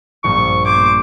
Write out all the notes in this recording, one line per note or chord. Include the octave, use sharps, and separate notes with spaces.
A#1 G2 C#6
C5 D6 G#6